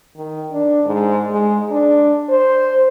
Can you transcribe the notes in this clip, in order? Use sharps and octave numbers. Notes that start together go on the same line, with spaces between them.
D#3
D4
G#2
G#3
D4
C5